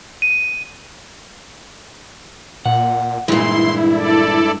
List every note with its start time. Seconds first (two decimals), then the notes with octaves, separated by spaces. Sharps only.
0.22 D#7
2.66 A#2 F#5
3.28 G2 A#2 E3 G#3 E4 C6
3.93 A4 D5